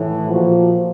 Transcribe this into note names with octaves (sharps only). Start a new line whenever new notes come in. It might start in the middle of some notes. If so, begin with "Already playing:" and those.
Already playing: A2 E3
A#2 F3 F#4